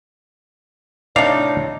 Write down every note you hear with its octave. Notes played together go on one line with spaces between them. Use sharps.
A2 C3 D4 D#4 C#5 D5 F5